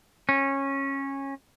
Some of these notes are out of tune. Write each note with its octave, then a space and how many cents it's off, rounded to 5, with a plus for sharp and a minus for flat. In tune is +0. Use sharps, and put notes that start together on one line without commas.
C#4 -15